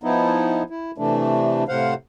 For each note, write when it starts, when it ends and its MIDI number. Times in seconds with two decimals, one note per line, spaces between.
0.04 0.63 53
0.04 0.63 59
0.04 0.63 63
0.04 0.63 64
0.70 0.91 64
0.98 1.64 48
0.98 1.64 52
0.98 1.64 57
0.98 1.64 62
1.68 1.94 45
1.68 1.94 48
1.68 1.94 72
1.68 1.94 77
1.68 1.94 78